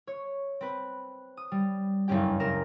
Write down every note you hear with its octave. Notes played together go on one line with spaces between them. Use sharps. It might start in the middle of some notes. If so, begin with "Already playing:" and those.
C#5
C4 B4
D#6
G3
F#1 C#2 G2 C#4 G4 G5
F#1 A#4 A#6 E7